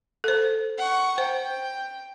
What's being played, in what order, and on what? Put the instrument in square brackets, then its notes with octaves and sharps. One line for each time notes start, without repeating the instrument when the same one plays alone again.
[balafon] A4 C5
[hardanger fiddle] F#5 C#6
[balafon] C5 [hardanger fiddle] G5